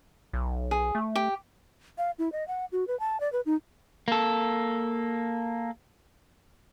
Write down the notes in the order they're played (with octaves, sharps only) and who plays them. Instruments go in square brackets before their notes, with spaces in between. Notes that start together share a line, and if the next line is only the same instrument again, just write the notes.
[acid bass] B1
[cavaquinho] G#4
[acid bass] A3
[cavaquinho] G4
[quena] F5
E4
D#5
F#5
F#4
B4
A5
D5
B4
D#4
[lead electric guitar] A#3 A4